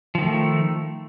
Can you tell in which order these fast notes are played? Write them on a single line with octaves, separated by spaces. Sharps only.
F3 D#3 A3